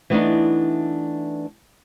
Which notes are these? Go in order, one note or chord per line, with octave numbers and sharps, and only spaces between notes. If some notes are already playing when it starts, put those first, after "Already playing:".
E3 A3 B3 C4 D4 D#4